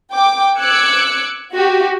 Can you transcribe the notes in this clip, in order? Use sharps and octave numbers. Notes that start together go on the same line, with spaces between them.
G5 D6
D6 E6 F#6 G#6 C#7
F#4 G4